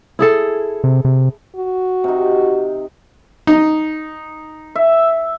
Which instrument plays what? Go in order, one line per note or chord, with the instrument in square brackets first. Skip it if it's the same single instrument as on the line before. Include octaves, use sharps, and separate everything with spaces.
[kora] E4 G#4 A4
[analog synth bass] C3
C3
[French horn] F#4
[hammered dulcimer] C3 D#4
[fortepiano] D#4
[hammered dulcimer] E5